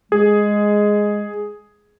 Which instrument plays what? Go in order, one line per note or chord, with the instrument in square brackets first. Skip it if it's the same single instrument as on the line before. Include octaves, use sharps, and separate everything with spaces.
[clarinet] G#3 [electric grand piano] G#4